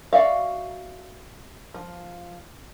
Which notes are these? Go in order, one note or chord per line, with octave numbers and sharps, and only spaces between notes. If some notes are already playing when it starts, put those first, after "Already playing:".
F#4 D5 E5 F5
F3